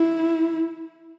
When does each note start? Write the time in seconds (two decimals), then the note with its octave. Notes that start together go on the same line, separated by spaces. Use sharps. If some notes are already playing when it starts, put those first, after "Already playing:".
Already playing: E4